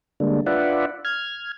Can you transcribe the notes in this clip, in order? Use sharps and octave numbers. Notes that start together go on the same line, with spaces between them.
D3 G3 G#3 A#3 D4
D4 F4 B4 D5 E5 F#5
F6 G#6